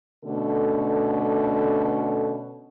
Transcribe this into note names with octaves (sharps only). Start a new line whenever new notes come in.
B2 D3 A3 C#4 A4